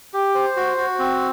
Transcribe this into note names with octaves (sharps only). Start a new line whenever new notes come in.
G4
C5
F#4
F#4
C4